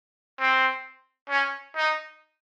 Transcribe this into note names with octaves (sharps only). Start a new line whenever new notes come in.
C4
C#4
D#4